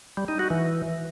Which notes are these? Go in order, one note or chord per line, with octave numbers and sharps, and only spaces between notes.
G3
D#4
F#4
E3